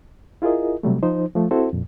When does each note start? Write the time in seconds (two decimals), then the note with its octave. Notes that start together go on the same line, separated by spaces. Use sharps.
0.42 E4 F4 G#4 A#4 D#5
0.83 C3 F#3 G3 A3
1.03 F3 D#4 C5
1.36 F3 A3
1.51 C4 E4 F#4 A4 C5
1.73 F2 A#2